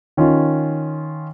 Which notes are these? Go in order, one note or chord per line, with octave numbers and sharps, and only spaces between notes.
D#3 C#4 D#4 F4